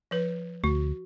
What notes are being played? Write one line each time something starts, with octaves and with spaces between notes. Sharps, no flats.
F3 B4
D2 F#4